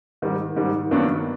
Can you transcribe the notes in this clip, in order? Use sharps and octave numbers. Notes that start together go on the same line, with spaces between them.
G#2 D#3 G3
G#2 D#3 G3
G2 D#3 F#3 B3 D4